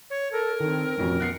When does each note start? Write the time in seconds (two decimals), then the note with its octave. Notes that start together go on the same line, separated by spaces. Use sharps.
0.10 C#5
0.32 A4 A#4
0.60 D#3 C4
0.98 A1 F2 B2 C#4
1.20 B3 F#6 C7 C#7